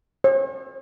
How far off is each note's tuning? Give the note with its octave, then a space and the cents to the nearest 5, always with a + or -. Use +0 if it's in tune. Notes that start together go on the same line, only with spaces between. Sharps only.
C#5 -45